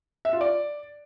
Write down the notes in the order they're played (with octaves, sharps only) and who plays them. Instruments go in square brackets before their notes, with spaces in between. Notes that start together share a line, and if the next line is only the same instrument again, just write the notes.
[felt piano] E5
F4
D5